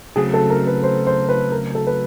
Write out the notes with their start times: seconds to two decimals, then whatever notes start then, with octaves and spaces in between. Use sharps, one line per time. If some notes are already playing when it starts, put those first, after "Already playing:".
0.16 C#3 F#3 A3 C4 G#4
0.34 A4
0.50 A#4
0.67 B4
0.83 C5
1.07 C5
1.29 B4
1.52 A#4
1.75 A4
1.87 B4